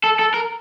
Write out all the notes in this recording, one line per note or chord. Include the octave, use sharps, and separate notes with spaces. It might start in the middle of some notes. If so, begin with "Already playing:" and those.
A4
A4
A#4